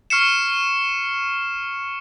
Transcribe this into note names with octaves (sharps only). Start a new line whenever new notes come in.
C#6 F6 C7 C#7 E7